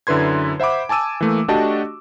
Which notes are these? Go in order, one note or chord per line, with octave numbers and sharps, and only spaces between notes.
F#2 D3 E4 B4 C6 G#6
C5 E5 F#5 B5 D6
G#5 A5 D6 E6 D#7
E3 A3 A#3
A3 D4 F#4 G4 D#5 A5